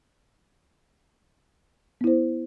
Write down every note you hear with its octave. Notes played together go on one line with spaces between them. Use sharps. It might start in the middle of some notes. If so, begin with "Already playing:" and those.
B3 E4 C5